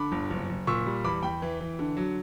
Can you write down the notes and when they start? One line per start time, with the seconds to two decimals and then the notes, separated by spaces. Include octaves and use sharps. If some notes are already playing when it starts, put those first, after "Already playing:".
Already playing: D3 B5 D6
0.12 G1
0.30 F#1
0.49 F#1
0.67 A#2 C#6 E6
0.86 G3
1.04 E2 B5 D6
1.22 E2 G5 B5
1.42 E3
1.60 E3
1.79 D3
1.97 F#3